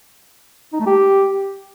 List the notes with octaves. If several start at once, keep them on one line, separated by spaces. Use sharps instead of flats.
D#4
A3
G4